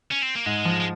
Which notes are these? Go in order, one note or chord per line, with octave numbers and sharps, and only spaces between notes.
C#4
C4
A#3
G#2 G#3
F3
G#3